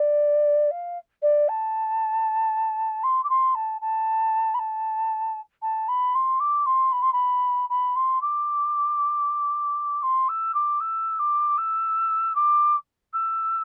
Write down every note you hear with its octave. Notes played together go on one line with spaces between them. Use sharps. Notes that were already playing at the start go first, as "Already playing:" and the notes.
Already playing: D5
F5
D5
A5
C6
D6
C6
A5
A5
B5
A5
A5
B5
C6
D6
C6
B5
C6
B5
B5
C6
D6
C6
E6
D6
E6
D6
E6
D6
E6